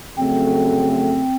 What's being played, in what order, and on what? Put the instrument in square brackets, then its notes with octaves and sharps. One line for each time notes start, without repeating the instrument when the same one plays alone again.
[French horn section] F2 C#3 F#3 A3 [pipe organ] C4